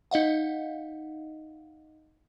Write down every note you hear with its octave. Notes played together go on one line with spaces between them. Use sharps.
D#4 D#5 F5 F#5